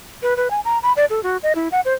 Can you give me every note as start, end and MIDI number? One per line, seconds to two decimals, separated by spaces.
0.22 0.36 71
0.37 0.50 71
0.51 0.60 80
0.65 0.79 82
0.83 0.93 83
0.97 1.05 74
1.10 1.23 69
1.23 1.37 66
1.43 1.55 75
1.55 1.68 64
1.72 1.80 78
1.85 1.94 72